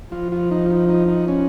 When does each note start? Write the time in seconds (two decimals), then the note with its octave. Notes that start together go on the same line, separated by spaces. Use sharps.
0.12 F3 F4
0.32 F4
0.51 D#4
0.66 F4
0.71 D#4
0.89 D#4
1.08 D#4
1.28 C#4